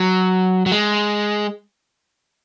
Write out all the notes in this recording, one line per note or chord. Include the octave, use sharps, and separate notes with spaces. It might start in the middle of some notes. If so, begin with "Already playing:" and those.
Already playing: F#3
F#3
G#3